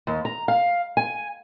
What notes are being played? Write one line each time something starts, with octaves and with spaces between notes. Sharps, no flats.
D#2
A#5
F5
G#5